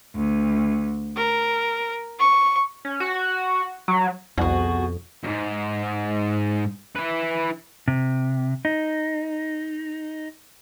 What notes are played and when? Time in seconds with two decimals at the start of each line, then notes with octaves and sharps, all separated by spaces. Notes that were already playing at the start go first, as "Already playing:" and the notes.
0.15 D2
1.16 A#4
2.18 C#6
2.85 C#4
3.00 F#4
3.88 F#3
4.38 C2 F2 B2 F#4 G#4
5.23 F2 G#2
6.96 E4 B4
7.88 C3
8.65 D#4